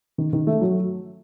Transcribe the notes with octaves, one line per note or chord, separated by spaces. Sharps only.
D#3
D#3
A3
F#3